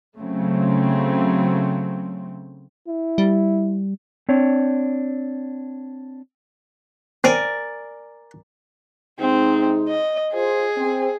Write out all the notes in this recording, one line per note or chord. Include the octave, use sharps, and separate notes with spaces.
C#3 F#3 A3 C4
E4
G3
C4 D4 C#5
C4 A#4 D5 G#5
C3 G#3 C4 D#4
D#5
F4 G#4 C5
C4